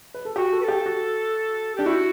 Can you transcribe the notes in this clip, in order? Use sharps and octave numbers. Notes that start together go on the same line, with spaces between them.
B4
A4
F#4 G4
A4
B4
G4 A4
F#4
D4 G4
E4 F#4